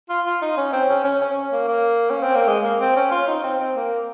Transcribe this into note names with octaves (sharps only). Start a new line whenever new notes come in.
F4
F4
D#4
C#4
C4
C#4
C#4
C#4
A#3
A#3
C#4
C4
A#3
G#3
A#3
C4
C#4
F4
D#4
C4
C4
A#3